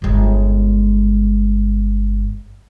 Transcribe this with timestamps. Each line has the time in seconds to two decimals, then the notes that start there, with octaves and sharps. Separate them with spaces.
0.02 G1 G#3